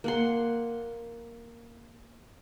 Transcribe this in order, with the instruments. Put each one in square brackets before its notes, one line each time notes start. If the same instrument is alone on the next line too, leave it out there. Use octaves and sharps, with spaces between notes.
[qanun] A#3 F#5 C6